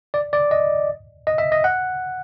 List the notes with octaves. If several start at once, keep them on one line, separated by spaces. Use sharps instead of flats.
D5
D5
D#5
D#5
E5
D#5
F#5